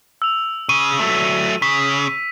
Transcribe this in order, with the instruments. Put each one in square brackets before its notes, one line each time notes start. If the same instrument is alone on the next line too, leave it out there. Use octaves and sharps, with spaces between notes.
[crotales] E6 F7
[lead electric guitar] C#3 [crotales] D#7
[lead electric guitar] F#3 A3
[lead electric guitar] C#3 [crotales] B6